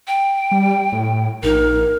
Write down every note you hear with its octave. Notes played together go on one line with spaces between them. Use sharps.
G5
G3
A2
A#1 D#4 A#4